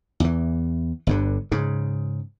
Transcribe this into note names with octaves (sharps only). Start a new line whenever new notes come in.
E2 E3
G1 G2 D3
G#2 C#3